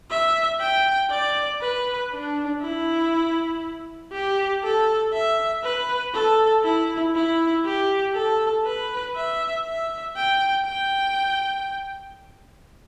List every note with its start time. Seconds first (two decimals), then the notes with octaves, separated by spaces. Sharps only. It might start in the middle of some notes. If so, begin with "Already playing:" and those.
0.10 E5
0.60 G5
1.10 D5
1.62 B4
2.12 D4
2.62 E4
4.12 G4
4.63 A4
5.13 E5
5.64 B4
6.14 A4
6.64 E4
7.15 E4
7.65 G4
8.14 A4
8.65 B4
9.16 E5
9.65 E5
10.16 G5
10.67 G5